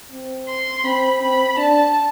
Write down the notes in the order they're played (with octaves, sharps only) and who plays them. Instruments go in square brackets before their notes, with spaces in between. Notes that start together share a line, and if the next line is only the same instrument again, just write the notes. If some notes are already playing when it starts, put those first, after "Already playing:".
[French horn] C4
[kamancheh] C6
[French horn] C4 [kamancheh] B5
[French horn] C4 [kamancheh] B5
[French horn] D4 [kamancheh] A5